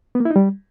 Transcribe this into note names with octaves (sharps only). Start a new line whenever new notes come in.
B3
A#3
E4
D#4
G3